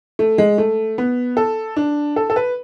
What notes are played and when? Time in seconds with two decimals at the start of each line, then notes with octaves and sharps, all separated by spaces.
0.19 A3
0.38 G#3
0.58 A3
0.98 B3
1.37 A4
1.76 D4
2.16 A4
2.30 A4
2.36 B4